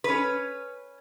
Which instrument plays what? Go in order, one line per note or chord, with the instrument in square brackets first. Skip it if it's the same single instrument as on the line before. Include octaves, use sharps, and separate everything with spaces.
[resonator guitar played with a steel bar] C#4 B4